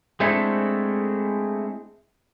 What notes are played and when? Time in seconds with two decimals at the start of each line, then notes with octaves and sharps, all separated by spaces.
0.20 G#3 A3 C4 D4 E4 A4